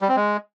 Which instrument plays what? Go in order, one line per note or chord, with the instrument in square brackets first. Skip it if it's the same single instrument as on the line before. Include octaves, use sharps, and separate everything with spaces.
[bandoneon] G3
C4
G#3